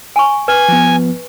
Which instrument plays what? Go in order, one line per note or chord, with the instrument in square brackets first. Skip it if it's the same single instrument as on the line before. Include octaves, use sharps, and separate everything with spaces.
[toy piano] G#5 C#6
[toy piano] B4 [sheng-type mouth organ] G#5
[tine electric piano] F3 B3